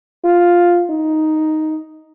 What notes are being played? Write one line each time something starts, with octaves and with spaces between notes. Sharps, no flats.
F4
D#4